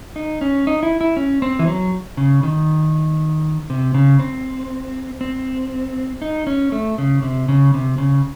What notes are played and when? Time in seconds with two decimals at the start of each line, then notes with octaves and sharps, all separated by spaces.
0.16 D#4
0.41 C#4
0.67 D#4
0.83 E4
1.01 E4
1.17 C#4
1.42 C4
1.59 E3
1.67 F#3
2.17 C#3
2.43 D#3
3.70 C3
3.94 C#3
4.19 C4
5.21 C4
6.22 D#4
6.47 C#4
6.72 A3
6.98 C#3
7.22 C3
7.48 C#3
7.74 C3
7.98 C#3